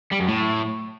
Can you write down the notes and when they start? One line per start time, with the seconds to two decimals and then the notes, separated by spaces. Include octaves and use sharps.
0.12 G3
0.20 F#2
0.29 A2